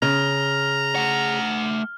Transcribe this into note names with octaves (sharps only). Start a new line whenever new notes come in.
C#3 A#5 F6
A3 F#5